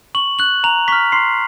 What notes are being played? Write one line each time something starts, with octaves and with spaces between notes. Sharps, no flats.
C#6 F#7
F#6 F#7
A#5 F7
C#6 F6 B6
C6 C7